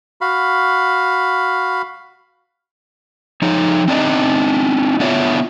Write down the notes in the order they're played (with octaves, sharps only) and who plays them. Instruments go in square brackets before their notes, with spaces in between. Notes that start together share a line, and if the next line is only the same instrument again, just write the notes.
[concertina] F#4 F5 B5
[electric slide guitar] F3 D#4 C#5
C4 D4 D#4 D#5
B3 D4 E4 F4 C#5